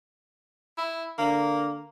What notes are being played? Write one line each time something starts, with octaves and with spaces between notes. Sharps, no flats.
E4
D3 A#3